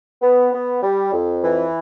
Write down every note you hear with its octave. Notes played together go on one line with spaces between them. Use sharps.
B3
B3
G3
F2
E3